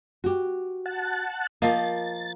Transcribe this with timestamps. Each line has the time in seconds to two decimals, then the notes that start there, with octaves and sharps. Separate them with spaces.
0.24 F#4 G4
0.86 F#5 A5
1.62 F3 A#3 D#5 A6